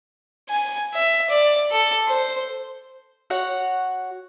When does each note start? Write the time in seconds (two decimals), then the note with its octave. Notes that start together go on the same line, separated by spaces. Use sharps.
0.49 G#5
0.94 E5
1.30 D5
1.71 A4
2.07 C5
3.30 F#4 C#5 F#5